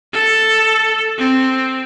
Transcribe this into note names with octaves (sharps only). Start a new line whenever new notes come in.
A4
C4